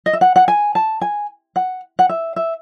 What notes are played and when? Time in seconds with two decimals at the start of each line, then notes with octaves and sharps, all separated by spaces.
0.06 D#5
0.13 E5
0.21 F#5
0.36 F#5
0.48 G#5
0.75 A5
1.01 G#5
1.56 F#5
1.99 F#5
2.09 E5
2.36 E5